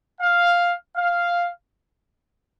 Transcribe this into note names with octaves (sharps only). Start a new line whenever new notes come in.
F5
F5